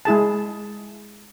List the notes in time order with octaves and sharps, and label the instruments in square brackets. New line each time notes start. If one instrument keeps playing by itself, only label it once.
[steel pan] G#3 E4 G#4 A5